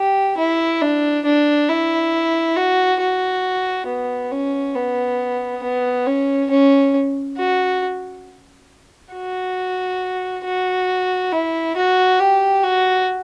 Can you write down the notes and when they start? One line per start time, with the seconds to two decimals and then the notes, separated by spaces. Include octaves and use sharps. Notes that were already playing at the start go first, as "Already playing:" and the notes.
Already playing: G4
0.37 E4
0.81 D4
1.25 D4
1.68 E4
2.56 F#4
3.00 F#4
3.87 B3
4.31 C#4
4.75 B3
5.63 B3
6.07 C#4
6.50 C#4
7.38 F#4
9.13 F#4
10.44 F#4
11.32 E4
11.76 F#4
12.19 G4
12.63 F#4